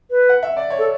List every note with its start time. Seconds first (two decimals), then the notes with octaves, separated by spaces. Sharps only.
0.11 B4
0.29 F#5
0.43 E5
0.57 D5
0.70 C#5
0.79 A4